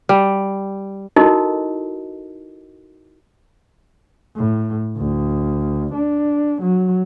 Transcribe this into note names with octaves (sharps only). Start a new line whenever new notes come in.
G3
D#4 E4 F#4 A4 A#4 D#5
A2
D2
D4
F#3